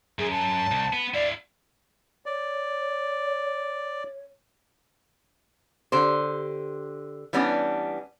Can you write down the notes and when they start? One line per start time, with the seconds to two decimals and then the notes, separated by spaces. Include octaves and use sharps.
0.19 F#2 G#4
0.31 A5
0.71 C2
0.93 B3 B4
1.14 E4 D5 F5
2.26 C#5 D5
5.92 D3 G4 C5
7.33 E3 G3 B3 C#4 D4